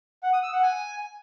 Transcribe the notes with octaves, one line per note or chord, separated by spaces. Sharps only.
F#5
D#6
E6
F#5
G#5